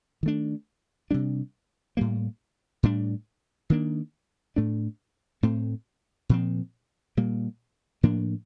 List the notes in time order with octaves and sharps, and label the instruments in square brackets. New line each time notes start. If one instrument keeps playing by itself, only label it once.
[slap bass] D#3 A3 D4
C3 G3 D4
A2 G3 A#3
A2 G3 D4
D#3 A#3 D4
A2 A3 D4
A2 A3 C4
A#2 F3 C4
A#2 G3 A#3
A2 F3 A#3 D4